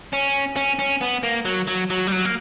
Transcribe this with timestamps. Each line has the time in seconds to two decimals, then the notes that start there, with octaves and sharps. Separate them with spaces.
0.13 C#4
0.56 C#4
0.79 C#4
1.01 B3
1.23 A#3
1.45 F#3
1.68 F#3
1.90 F#3
2.07 G3
2.12 F#3
2.25 A#3